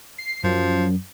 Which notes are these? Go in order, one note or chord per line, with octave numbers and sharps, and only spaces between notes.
C7
F#2 F3